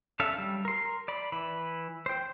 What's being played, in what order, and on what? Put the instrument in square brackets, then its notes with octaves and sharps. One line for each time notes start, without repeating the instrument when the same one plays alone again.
[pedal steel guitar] C#4 D4 A4 E5 F5
G3
A#4 C6
D5 B5
E3 B5
C5 G5